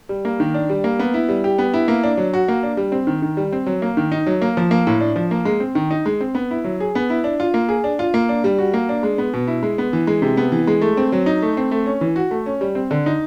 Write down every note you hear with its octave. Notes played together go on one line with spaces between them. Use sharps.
G3
A#3
D#3
D4
G3
A#3
B3
E4
G3
G4
B3
E4
A#3
D4
F#3
F#4
A#3
D4
G3
C4
D#3
D#3
G3
C4
F#3
A#3
D#3
D#4
F#3
A#3
F3
A#3
A2
D4
F3
A#3
G#3
C4
D#3
D#4
G#3
C4
B3
E4
F#3
G#4
B3
E4
D4
F4
A#3
G#4
D4
F4
A#3
D4
G3
F#4
A#3
D4
G#3
B3
B2
E4
G#3
B3
E3
G#3
C3
B3
E3
G#3
A3
C4
F#3
D#4
A3
C4
A3
C#4
E3
F#4
A3
C#4
G3
C4
D3
D#4